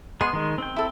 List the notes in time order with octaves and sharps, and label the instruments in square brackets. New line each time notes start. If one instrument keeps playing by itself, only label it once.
[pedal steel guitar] G#3 B3 G#4 [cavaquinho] C6
[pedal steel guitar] D#3 G#3
C4 G5
[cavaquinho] E4 A4